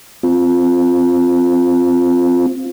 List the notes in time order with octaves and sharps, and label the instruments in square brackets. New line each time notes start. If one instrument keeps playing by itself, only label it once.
[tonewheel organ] C4 F4